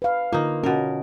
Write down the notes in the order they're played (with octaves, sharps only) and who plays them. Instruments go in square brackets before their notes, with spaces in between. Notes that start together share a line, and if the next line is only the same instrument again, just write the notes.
[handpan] B4 F5
[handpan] D3 F4 [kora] A#3 D#4
[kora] B2 A#4 [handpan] C#4